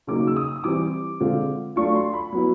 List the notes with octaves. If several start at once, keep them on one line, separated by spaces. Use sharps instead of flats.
C#3 F#3 A#3 D#4 D6
E6
D#6
D#6
E3 G3 C4 D6
D3 F3 G#3 C4 F4
F#3 A3 D4 F4 C#6
C6
B5
F#3 B3 E4